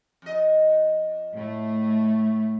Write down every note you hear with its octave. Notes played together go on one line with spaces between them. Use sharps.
F2 D#5
A2 A3